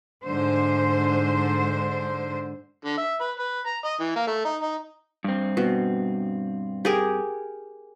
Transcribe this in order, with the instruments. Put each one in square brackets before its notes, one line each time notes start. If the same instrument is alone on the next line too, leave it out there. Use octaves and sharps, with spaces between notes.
[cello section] G#2 D3 C5
[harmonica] D3
E5
B4
B4
A#5
D#5
E3
A#3
A3
D#4
D#4
[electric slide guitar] G2 C4
[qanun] B2
G4 G#4 A#4